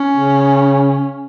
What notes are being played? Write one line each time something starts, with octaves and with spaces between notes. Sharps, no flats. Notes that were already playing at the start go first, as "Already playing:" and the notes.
Already playing: C#4
C#3